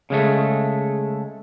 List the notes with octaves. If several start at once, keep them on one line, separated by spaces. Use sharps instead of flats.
C#3 G#3 A3